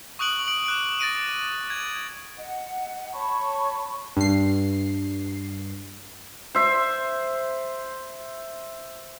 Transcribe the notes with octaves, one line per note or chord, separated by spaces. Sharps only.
C#6 D#6 F#6 D7 F#7
D7 F#7
D6 F#6 D7
A6 A#6 D7 D#7
G#6
D#5 F#5
C#5 A5 B5 C#6
G2 C7
C5 E5